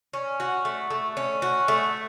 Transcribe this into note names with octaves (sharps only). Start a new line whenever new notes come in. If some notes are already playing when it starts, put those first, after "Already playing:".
C#4
F#4
A3
A3
C#4
F#4
A3